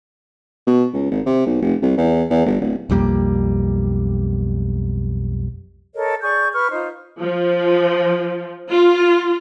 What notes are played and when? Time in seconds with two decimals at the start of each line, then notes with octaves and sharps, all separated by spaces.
0.67 B2
0.93 C#2
1.11 G#1
1.26 C3
1.46 B1
1.62 F1
1.82 C2
1.97 E2
2.30 E2
2.46 G1
2.61 D1
2.90 B1 F2 G3 A#3
5.93 A4 A#4 C#5 D#5
6.21 G#4 D5 C#6 G6
6.53 B4 C#6 F6
6.70 D#4 F4 C5
7.20 F3
8.70 F4